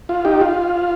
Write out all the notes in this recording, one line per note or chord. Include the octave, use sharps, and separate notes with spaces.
F4
D#4 G4
F4